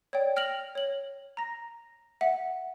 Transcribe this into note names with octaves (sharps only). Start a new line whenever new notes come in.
C#5 D5 G5
G5 F6 A#6 F7 F#7
C#5 F#7
A#5 A#6
E5 F#5